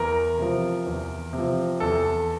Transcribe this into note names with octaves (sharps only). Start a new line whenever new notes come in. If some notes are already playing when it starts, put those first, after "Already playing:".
Already playing: E2 A#4
C3 F3
E2
C3
F3
E2 A4